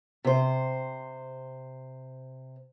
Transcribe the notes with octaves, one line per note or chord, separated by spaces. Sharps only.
C3 C5